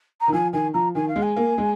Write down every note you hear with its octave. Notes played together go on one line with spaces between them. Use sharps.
A#5
D#3
F3 G#5
D#3 G#5
F3 A#5
D#3 G#5
F5
G#3
G#5
A#3
G#3